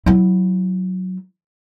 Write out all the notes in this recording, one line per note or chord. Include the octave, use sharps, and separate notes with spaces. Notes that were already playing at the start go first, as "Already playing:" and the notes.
F#3 E4